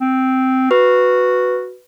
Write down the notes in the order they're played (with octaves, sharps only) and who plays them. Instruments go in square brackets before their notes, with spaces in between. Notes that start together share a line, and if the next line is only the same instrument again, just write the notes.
[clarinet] C4
[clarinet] F#4 [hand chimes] B4